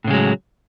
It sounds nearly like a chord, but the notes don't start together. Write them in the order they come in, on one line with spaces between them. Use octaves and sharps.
A2 C#3 G#3 F#3